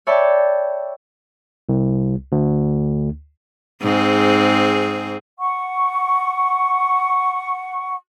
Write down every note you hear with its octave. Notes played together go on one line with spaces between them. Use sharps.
C#5 D5 E5 G5 A5 B5
C2
D2
G#2 C4 G#4
F#5 C#6